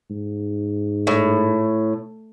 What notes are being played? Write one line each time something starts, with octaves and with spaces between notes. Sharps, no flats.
G#2
A2